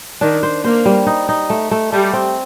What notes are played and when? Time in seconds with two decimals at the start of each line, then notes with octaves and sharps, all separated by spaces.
0.21 D#3 D4
0.43 C5
0.64 A#3 C5
0.85 G3
1.07 D#4
1.29 D#4
1.50 A3
1.71 A3
1.92 G3 A3
2.13 C4